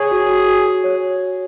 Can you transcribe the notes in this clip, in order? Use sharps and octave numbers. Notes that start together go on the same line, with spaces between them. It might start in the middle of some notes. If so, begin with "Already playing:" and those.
Already playing: G#4 C#5 C#6
F#4
F#4
F#4
G#5
C#5